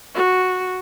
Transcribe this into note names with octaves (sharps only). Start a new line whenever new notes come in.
F#4